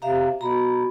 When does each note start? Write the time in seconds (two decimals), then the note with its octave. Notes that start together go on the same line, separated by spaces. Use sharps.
0.02 C3 E5 F5 A#5
0.41 B2 A#5 B5